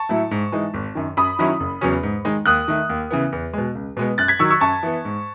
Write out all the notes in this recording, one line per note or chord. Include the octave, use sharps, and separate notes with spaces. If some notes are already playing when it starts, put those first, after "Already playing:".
Already playing: A5 C#6
A2 F#3 A3 E4
G#2
E3 G#3 D#4
G#1
F#2 D#3
F#2 B5 D#6
D#3 F#3 C#4 E4
F#1
E2 C#3 F#3 C#4
G#2
D#3 G#3 D#4
D#2 D#6 F#6
D#3 A3
D#2
C#3 E3 B3
E2
B2 G#3
C#2
B2 G#3 B3
F#2 F#6 A6
G#6 B6
D#3 F#3 C#6 E6
C#6 E6
F#2 A5 C#6
E3 B3
G#2